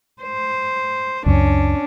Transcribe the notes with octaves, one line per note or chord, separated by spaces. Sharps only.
C5
C#2 F#2 C#4 D4